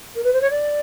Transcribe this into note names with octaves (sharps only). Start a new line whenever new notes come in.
A#4
B4
C5
C#5
D5